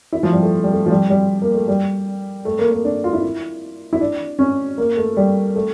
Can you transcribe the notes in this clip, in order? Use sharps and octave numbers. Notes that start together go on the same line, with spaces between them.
E4
F3
G3
A3
G3
A3
F3
G3
G3
A#3
A3
G3
A3
A#3
A#3
D4
F4
E4
E4
D4
C#4
A#3
A3
G3
A3